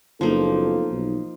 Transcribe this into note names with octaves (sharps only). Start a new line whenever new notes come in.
F#1 F3 A#3 B3 D#4 F4 A4
B1